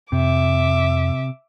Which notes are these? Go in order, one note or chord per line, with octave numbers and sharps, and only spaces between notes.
F2 C3 E5 D6